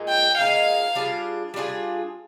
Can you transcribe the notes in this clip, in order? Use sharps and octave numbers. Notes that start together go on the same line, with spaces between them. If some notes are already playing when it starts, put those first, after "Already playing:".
Already playing: A#2 G#3 D#4
G5
A#2 G#3 D#4 F5
G3 D4 F4 G#4
G3 D4 F4 G#4